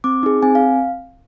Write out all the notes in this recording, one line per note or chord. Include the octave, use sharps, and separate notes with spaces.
C4 D6
D#4 G#4
C4 G#5
F5